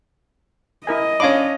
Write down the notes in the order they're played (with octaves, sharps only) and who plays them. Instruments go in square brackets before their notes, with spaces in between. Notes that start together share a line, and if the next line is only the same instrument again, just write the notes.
[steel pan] E4 A#4 G#5 [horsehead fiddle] D#5
[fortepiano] C#4 D4 [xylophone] C#5 F5 B5 [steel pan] D6